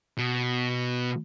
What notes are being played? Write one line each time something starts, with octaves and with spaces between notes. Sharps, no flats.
B2